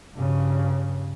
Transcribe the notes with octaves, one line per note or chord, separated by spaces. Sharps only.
G2 C#3